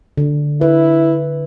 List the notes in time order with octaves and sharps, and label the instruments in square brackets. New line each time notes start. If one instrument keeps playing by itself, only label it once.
[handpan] D3
[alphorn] E4 [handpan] B4